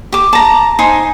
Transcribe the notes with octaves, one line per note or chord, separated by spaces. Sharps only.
G4 D6
A5 A#5
D#4 C5 G#5 C6